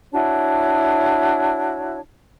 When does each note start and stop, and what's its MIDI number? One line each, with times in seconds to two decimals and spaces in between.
0.12 1.99 62
0.12 1.99 64
0.12 1.99 66
0.12 1.99 73